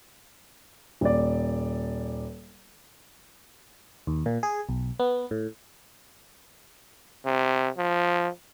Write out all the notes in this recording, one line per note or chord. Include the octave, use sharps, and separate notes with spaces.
D#1 D5
D#2
A#2
G#4
B1
B3
A2
C3
F3